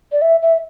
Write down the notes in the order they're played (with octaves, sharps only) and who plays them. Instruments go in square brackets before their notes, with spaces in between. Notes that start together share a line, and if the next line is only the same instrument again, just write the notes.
[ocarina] D5
E5
E5